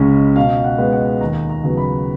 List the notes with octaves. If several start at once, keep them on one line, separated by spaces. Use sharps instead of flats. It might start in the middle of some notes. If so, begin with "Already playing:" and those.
Already playing: C#2 C#3 G#3 C#4
B2 F5
F#5
G#3 B3
F#5
D#2 A#5
A#5
C#3 F#3 B3
B5